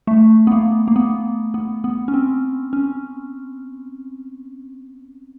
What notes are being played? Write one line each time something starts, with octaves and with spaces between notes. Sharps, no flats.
A3
B3
A#3
A#3
B3
B3
B3
C#4
C4
C#4